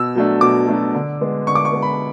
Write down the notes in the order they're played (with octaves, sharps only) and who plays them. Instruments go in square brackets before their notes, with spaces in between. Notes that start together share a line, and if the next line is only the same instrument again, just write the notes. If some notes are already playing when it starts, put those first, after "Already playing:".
Already playing: [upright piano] B2 E6
F#3 A3 D4
B2 D6
F#3 A3 D4
D3
G#3 B3
D3 C#6
D6
C#6
G#3 B3
B5